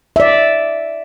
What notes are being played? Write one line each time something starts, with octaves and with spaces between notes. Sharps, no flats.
D5 E5